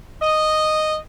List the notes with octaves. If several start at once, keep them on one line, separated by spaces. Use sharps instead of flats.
D#5